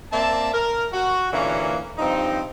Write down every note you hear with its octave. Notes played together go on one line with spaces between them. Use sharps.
A#3 C4 D5 E5 A5
A#4
F#4
A#2 D3 E3 A#3 C#4 F#4
G2 F3 C4 D#4